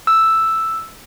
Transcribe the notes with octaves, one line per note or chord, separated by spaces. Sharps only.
E6